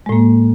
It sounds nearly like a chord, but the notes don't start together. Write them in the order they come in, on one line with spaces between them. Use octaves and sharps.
G#3 A2 A#3